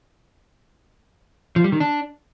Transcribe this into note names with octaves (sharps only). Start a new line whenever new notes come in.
F3
G3
D#3
D4